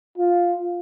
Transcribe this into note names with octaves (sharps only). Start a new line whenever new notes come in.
F4